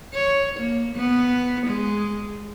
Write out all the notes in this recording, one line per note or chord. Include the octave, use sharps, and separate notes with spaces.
C#5
A#3
B3
G#3